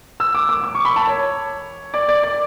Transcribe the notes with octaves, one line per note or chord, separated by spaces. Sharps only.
E6
D6
D6
D6
C#6
B5
A5
C#5
D5
D5
D5